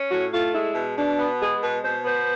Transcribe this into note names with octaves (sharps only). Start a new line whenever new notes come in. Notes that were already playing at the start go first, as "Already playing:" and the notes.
Already playing: C#4
A2 F#4
A3 F4
G#3 E4
B2
B2 D4
B3
G#3 G#4
B2 B4
B2 C5
B3 C5